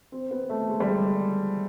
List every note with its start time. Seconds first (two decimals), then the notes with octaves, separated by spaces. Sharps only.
0.12 C4
0.31 B3
0.49 A3
0.68 G#3
0.80 G3
0.87 G#3